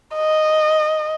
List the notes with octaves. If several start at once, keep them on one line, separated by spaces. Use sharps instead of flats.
D#5